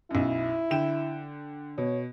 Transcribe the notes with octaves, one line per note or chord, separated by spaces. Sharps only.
B1 F#2 E4
D3 G5 E7
B2 C#5